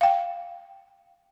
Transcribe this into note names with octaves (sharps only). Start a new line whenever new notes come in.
F5 G5